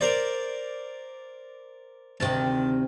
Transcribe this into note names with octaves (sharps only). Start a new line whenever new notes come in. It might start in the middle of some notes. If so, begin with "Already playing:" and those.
A#4 C5 D5
D2 C3 D#3 A5